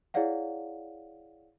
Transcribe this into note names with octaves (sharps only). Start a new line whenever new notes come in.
E4 G#4 C#5 D5 F5 F#5